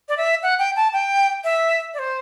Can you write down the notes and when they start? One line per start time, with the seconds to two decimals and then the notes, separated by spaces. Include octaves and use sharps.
0.09 D5
0.17 E5
0.43 F#5
0.59 G5
0.76 A5
0.93 G5
1.44 E5
1.94 D5
1.99 C5